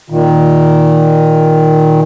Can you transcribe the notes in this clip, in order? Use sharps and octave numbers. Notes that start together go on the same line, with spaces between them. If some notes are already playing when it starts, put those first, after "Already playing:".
A#2 D#3